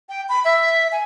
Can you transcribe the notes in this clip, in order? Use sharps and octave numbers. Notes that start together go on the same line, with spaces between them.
G5
B5
E5
G#5